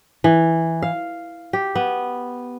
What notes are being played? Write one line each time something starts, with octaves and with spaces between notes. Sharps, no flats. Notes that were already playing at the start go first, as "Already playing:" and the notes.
E3
F5
G4
B3